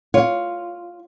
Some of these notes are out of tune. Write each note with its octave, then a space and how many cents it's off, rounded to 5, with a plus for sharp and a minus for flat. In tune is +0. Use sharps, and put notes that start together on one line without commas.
F4 +0 C#5 +10